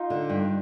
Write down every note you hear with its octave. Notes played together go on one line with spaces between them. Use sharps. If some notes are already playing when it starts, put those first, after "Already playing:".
Already playing: D#4 F4
D3
G2